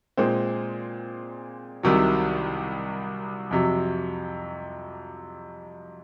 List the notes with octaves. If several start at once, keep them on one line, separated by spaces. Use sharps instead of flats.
A#2 G#3 C4
C2 C3 D#3 F#3
F2 C3 F#3